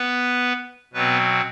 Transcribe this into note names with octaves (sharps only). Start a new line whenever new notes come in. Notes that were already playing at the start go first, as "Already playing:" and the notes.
Already playing: B3 B4
B2 F#3 B3 C4 B4